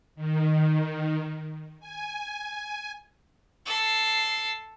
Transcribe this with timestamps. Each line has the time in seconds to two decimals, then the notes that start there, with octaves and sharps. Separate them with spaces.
0.16 D#3
1.80 G#5
3.65 A4 C7